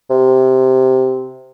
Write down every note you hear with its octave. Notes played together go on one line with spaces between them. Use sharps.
C3